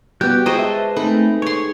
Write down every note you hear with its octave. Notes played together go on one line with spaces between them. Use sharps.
G3 B3 F#4 G4 F#6 G6
G#3 F4 B4 C5 D#5 A#5 C#6 D#6
B4 E5 A5
A3 C4 D#4 G#4 A4 B4 B5
C#5 C6 C#6